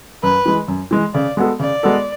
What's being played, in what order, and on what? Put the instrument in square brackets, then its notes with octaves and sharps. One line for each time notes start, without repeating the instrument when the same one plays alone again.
[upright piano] F#2 [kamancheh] B4
[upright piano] E3 G#3
F#2
E3 G#3
[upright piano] C#3 [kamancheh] D5
[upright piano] G#3 B3 F#4 A4
[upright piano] C#3 [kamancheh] D5
[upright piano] G#3 B3 F#4 A4